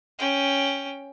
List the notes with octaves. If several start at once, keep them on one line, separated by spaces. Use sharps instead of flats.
C#4 G5